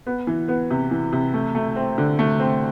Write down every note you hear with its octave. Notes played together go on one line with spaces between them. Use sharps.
B3
E3
B3
C3
E3
C3
A3
A3
C4
D3
A3
C4